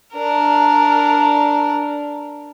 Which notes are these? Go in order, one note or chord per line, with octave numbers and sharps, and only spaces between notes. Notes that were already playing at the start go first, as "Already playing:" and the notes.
D4 A#4